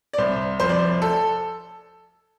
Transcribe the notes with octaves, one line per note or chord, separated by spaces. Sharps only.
D5
C2 C5
F2 C5
D5
C5
A4